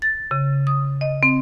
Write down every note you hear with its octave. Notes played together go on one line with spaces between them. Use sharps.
A6
C#3
D#6
D#5
C4